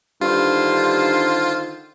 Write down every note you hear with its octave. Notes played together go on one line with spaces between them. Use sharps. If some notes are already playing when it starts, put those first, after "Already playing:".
G2 D3 D#3 F4 C5